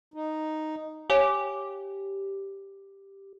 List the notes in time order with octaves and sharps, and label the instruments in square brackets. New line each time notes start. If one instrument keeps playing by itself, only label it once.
[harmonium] D#4
[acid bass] G4 [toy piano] C#5 F5 G#5